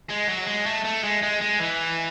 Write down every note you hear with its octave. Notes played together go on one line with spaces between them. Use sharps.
G#3
F#3
G#3
A3
A3
G#3
G#3
G#3
E3